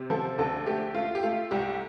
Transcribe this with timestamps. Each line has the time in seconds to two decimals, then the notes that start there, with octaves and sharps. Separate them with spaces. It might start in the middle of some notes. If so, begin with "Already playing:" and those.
Already playing: C3
0.10 F3 A4
0.38 D2 A4
0.66 A3 G4
0.95 A3 F4
1.15 G4
1.23 A3 F4
1.51 C2 G4